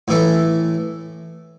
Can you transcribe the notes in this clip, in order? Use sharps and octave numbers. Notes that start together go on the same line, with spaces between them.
A2 E3 A3